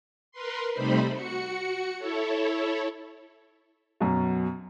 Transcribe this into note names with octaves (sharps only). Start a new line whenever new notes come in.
A#4 B4 C6
C3 G3 A3 D#4 C5 B5
F#4 C#7
E4 A4 C#5
F#2 B2